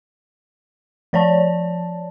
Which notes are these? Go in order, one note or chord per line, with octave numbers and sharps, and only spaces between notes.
F3 C#5 D5 A5